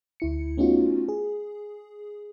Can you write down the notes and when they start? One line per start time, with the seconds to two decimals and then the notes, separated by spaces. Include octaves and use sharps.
0.20 D2 E4 C#7
0.57 A3 B3 C#4 D#4 F4 F#4
1.09 G#4